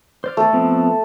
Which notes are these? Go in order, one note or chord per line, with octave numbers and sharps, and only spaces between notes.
C5 D5 F6
A3 A4
F3 B3 C4